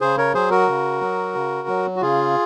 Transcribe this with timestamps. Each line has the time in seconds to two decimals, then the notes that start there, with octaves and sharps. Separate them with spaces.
0.01 C#3 G#4 C5
0.18 A#4 C#5
0.34 F#3 G#4 C5
0.50 F#4 A#4
0.68 C#3
1.01 F#3
1.35 C#3
1.68 F#3
1.96 F#4
2.01 C#3 F4 G#4